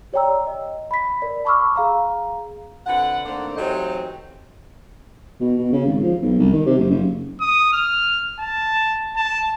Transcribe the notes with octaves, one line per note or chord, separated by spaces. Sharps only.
G4 C#5 D5 G5 A#5 E6
D#5
B5 B6
A#4 D5
A5 B5 C#6 D6 E6 F6
G#4 F5 A#5
F2 D3 B4 F#5
D#3 A3 A#3 C4 D4
E3 F#3 A3 C4 D#4 G4
B2
B2
C#3
G#1
F3
B1
C2
D#3
C3
F#1
F#1
D#6
F6
A5
A5